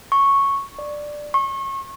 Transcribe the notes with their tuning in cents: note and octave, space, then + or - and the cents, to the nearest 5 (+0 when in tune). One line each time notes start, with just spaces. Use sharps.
C#6 -5
D5 +10
C#6 -30